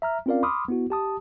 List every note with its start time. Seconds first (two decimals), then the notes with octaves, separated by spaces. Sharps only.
0.02 E5 A#5 F6
0.26 C4 C#4 F4 A#4 D5 F5
0.43 B5 C6 D6 D#6 F6
0.68 B3 E4 F#4
0.90 G4 A5 D#6